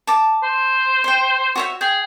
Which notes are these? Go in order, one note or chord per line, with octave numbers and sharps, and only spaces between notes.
A5 D6
C5
G5 C6
F#4 C#5 E5
G#4 G5